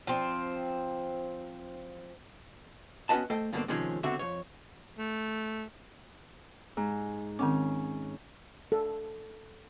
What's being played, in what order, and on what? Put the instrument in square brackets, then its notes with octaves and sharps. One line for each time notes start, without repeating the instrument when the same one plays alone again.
[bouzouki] F3 C4
[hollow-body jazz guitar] B3 C#4 F#4 B4 D#5 A5
A3 A4 C5 D#5 G5
G2 B2 D3 G3 A#3 C4
C3 D#3 F3 G#3 C4 C#4
C#2 B2 D3 C4 F#4 E5
F2 C#5
[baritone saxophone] A3
[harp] G#2
[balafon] D#3 C4 D6 [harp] C#4
[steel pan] A4